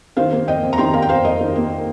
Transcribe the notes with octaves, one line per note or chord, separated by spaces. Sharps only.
D#3 C5 F5
A#3
F2 D#5 G5
F2
A#5
D#3 G5 C6
A#3 F5 A#5
G5
F2 C5 F5
F2 A#4 D#5
D#3
A#3